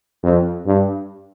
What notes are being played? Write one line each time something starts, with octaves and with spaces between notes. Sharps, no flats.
F2
G2